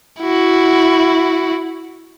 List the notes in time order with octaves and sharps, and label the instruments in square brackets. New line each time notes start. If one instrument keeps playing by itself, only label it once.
[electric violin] E4 F#4